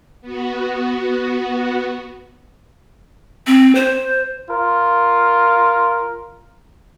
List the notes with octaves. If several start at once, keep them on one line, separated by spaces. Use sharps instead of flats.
B3 F#4
C4
C5
F4 A#4